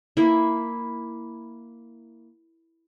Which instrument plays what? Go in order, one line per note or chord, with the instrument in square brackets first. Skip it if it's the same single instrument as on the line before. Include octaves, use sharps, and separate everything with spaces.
[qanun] A#3 E4